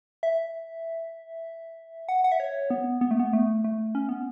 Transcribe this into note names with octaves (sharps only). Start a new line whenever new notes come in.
E5
F#5
F#5
E5
C#5
B3
B3
A3
B3
A3
A3
C#4
B3